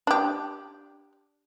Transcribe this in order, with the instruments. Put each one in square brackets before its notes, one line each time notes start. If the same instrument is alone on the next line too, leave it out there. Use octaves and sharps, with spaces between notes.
[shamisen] D4 G4